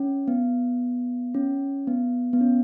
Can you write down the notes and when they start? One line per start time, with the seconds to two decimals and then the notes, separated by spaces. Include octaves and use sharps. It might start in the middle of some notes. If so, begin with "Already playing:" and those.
Already playing: C#4
0.28 B3
1.34 C#4
1.87 B3
2.33 B3
2.41 C#4